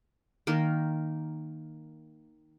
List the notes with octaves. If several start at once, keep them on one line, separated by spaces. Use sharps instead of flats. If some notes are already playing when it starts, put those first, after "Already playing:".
D#3 A#3 A#4